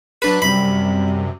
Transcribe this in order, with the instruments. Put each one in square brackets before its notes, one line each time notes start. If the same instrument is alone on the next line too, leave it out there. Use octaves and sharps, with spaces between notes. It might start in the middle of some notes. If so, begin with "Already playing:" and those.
[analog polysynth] F#3 D4 F#6 [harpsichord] B4
[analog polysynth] F#2 C3 [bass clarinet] G3 [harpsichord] B5